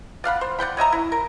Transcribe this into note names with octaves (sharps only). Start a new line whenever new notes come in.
D5 F5 F#5 B5
C5
D5 F#5 G5 B5
C#5 D#5 E5 A#5
E4
A#4